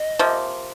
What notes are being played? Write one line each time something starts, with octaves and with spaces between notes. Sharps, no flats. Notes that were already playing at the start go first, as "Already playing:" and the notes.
Already playing: D#5
C3 F3 A#3